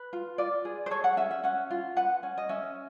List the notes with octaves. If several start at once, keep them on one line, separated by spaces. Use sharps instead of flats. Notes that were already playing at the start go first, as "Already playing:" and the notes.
Already playing: B4
F4
F4 D5
G#4
C5
A4 C#5
F#5
C#4 E5
E5
C#4 F#5
F4
B4 F#5
C#4
D#5
C#4 E5